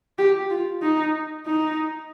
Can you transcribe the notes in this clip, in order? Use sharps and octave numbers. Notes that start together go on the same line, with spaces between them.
G4
F4
D#4
D#4